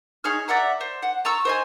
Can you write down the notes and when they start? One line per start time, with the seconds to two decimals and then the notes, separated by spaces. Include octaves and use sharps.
0.24 D#4 G#4 C#5 F6
0.48 D5 E5 F#5 A#5
0.81 C5
1.02 F#5
1.25 A5 A#5 C#6 E6
1.45 C5 D#5 G#5